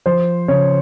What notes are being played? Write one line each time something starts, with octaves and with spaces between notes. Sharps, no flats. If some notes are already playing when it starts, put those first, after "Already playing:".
F3 C5
C#3 C#5